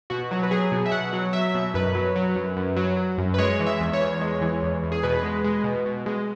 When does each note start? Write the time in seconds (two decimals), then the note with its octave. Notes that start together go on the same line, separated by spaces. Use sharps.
0.10 B2 F#4
0.31 F#3 F#4
0.43 B4
0.51 F#3 G#4
0.72 B2
0.86 E5
0.92 B2 F#5
1.13 F#3
1.33 F#3 E5
1.54 B2
1.74 F#2 B4
1.95 F#3
2.16 F#3
2.36 F#2
2.57 F#2
2.77 F#3
2.97 F#3
3.18 F#2
3.34 B4
3.39 G#3 C#5
3.60 E3
3.67 E5
3.80 E2
3.93 C#5
4.00 E2
4.21 G#3
4.42 E3
4.62 E2
4.83 E2
4.92 G#4
5.03 B2 B4
5.23 G#3
5.44 G#3
5.64 B2
5.86 B2
6.06 G#3